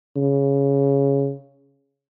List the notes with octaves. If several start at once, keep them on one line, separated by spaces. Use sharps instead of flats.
C#3